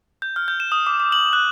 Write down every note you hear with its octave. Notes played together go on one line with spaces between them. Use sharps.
G6
F6
G6
E7
D#6
D6
D6
F#7
F#6